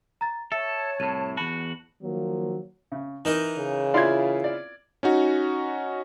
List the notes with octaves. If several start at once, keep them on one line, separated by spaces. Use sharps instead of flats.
A#5 A6
A4 C#5 E5 A5
C2 A2 D#7
E2 F#4 A5 B5
D#3 F3 F#3 A#3
C#3
E3 D#4 A#4 D#5
C#3
E4 F4 D5 F5 C6 G#6
D5
C#4 D#4 F#4